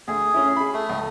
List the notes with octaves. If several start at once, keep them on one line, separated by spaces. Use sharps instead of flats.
D2 G#4
C#4 E4
G#4 B5
A3
C#2